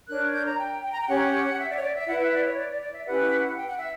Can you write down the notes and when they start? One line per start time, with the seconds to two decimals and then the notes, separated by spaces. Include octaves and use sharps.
0.09 D4 A#4 C#5 F#6
0.34 G6
0.46 A#5
0.59 G5
0.83 G5
0.92 A#5
1.00 G5
1.07 C#4 G4 C#5 F#5
1.58 E5
1.70 D5
1.76 C#5
1.82 D5
1.94 E5
2.07 E4 B4 F#5
2.20 E5
2.32 D5
2.45 C#5
2.57 D5
2.70 D5
2.82 D5
2.94 E5
3.06 C#4 E4 G4 B4 F#5
3.57 G5
3.66 F#5
3.78 E5